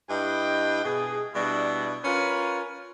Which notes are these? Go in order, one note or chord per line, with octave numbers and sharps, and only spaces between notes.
G2 E4 D#5 G5
B2 G#4
B2 G3 D4 E4
C#4 F4 A#4 B4